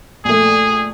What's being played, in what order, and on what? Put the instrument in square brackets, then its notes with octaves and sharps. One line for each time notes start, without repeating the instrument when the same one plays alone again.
[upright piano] A#1 A3 [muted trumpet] G#4